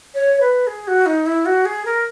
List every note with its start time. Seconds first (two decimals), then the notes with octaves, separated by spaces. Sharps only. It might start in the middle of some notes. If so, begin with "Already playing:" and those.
0.15 C#5
0.41 B4
0.67 G#4
0.88 F#4
1.06 D#4
1.26 E4
1.46 F#4
1.65 G#4
1.85 A#4